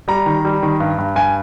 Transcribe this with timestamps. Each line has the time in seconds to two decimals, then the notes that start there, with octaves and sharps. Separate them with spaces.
0.08 G3 A#5
0.26 D#3
0.45 G3
0.63 D#3
0.80 G2
0.98 G2
1.16 G2 G#5